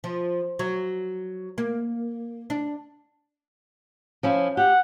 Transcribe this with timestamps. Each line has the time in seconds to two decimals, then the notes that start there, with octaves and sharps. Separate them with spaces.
0.04 F3
0.59 F#3
1.58 A#3
2.50 D4
4.23 F3 C#4 E4
4.57 G4 F#5